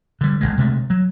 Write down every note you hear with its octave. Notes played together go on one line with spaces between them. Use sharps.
D3 G3
G1 C2 G#3
C3 G#3 A3
F#3